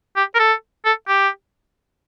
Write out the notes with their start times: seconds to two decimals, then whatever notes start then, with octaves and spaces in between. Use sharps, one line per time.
0.17 G4
0.35 A#4
0.39 A4
0.86 A4
1.08 G4